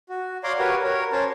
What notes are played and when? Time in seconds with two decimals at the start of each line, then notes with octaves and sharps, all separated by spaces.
0.09 F#4
0.44 C#5 D5 F5 A#5 C6 D6
0.59 F#4 G4 A#4 B4 C#5
0.84 A#4 C#5
1.12 C#4 C5 C#5 A5